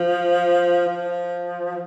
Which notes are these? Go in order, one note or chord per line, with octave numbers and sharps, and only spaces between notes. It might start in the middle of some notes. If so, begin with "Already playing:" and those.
Already playing: F3
F3